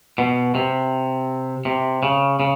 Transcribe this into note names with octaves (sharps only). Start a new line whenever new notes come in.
B2
C3
C3
C#3
C#3